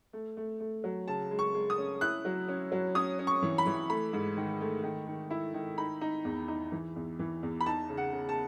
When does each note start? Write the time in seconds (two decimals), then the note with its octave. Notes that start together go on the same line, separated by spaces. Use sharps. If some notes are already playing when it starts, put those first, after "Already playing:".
0.13 A3
0.37 A3
0.60 A3
0.84 F#3
1.08 C#3 A5
1.31 G#3
1.39 C#6
1.54 G#3
1.70 D#6
1.78 C#4
2.01 E4 F#6
2.25 F#3
2.48 C#4
2.72 F#3
2.95 C#4 D#6
3.19 C#4
3.27 C#6
3.42 E3
3.58 B5
3.67 E3
3.90 A3 B5
4.13 G#2
4.37 D#3
4.61 A3
4.84 D#3
5.07 D#3
5.30 E4
5.54 D#3
5.78 D#4 B5
6.01 D#4
6.25 E2
6.48 D#4
6.72 E3
6.96 E2
7.19 E3
7.43 E2
7.60 B5
7.66 D#4 A5
7.90 C#3
7.97 F#5
8.13 C#3
8.29 A5